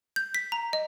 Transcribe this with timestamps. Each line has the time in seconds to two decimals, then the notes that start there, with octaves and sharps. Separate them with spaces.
0.16 G6
0.35 B6
0.52 A#5
0.73 D#5